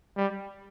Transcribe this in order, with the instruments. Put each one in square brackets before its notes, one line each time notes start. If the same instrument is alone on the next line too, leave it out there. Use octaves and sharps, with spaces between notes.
[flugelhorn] G3